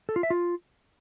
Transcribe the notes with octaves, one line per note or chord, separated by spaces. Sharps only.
A4
F4
E5
F4